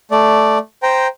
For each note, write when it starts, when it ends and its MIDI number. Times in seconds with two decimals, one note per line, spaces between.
0.11 0.58 57
0.11 0.58 74
0.83 1.07 72
0.83 1.07 79
0.83 1.07 82